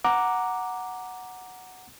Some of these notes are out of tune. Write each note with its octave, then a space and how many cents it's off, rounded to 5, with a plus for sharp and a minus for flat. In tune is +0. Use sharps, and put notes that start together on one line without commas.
F#5 +0 A#5 +0 D6 +0